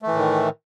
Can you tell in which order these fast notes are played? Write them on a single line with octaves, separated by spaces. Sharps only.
A3 E3 A2 D#3